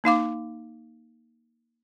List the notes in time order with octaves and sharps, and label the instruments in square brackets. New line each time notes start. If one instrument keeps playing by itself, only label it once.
[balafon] A#3 D#4 F5 D6